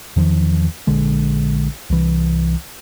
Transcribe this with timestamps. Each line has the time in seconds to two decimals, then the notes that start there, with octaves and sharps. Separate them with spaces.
0.16 E2 D#3 F3
0.87 A#1 D3 G#3
1.90 C2 E3